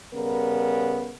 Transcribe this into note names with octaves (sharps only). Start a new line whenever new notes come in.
C#3 G3 B3 A#4